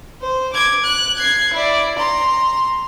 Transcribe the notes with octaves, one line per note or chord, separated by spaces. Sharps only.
C5
D6 G#6
F#6
G#6 C7
E4 D5
A#5 C6